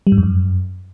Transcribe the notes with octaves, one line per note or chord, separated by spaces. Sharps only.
G3
G#2
F2
F#2